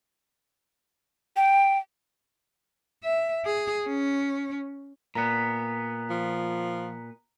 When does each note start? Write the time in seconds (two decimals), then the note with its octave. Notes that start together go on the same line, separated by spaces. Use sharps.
1.37 G5
3.04 E5
3.46 G#4
3.88 C#4
5.15 A#2 B3 A#5 B6
6.10 F3